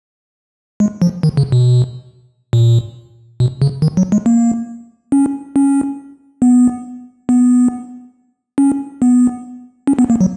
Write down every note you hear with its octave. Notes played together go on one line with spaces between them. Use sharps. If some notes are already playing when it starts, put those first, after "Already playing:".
G#3
F3
D#3
C#3
B2
A#2
B2
C#3
D#3
F#3
G#3
A#3
C#4
C#4
B3
B3
C#4
B3
C#4
B3
A#3
F#3